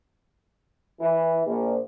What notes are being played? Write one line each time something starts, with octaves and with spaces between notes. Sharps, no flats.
E3
A#1